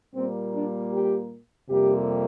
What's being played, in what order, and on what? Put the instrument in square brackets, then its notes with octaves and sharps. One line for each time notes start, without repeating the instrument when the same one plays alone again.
[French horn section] A#2 G3 A#3 C4
D4
G4
F2 C3 G3 A#3 G4